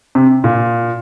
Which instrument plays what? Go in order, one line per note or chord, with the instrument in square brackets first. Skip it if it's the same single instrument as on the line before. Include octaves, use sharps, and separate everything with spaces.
[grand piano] C3
A#2